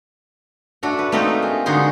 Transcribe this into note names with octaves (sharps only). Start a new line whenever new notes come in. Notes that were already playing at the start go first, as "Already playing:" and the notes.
A3 D4 F#4
B4
A3 A#3 C4 D#4 A#4 B4
G#4
D3 G#3 D#4 F#4 G#4 C6